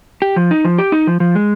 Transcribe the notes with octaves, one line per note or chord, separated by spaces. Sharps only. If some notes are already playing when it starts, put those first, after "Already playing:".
G4
F3
D#4
F3
G4
D#4
F3
F3
G#3